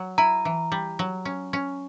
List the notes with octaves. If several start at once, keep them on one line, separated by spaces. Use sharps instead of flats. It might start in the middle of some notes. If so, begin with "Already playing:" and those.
Already playing: F#3
E4 A#5
E3
G3
F#3
C#4
C#4